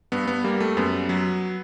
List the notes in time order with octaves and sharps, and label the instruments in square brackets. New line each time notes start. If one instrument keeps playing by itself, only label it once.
[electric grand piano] G2 B3
B3
G3 A#3
A3
F#2 B3
F#3